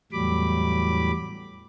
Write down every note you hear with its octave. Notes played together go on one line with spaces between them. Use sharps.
E2 A2 F#3 G3 B5 D6